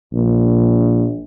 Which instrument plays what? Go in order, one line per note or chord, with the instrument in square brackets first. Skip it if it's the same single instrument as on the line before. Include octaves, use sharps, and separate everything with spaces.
[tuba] A#1